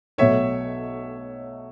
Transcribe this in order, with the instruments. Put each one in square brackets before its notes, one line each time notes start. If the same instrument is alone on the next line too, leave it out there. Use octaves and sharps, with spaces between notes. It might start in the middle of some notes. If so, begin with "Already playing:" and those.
[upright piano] B1 B2 F#3 A3 C#5 E5